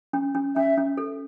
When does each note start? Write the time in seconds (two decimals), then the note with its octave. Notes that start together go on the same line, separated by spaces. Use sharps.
0.13 C#4
0.35 C#4
0.56 C#4 E5
0.77 C#4
0.97 A4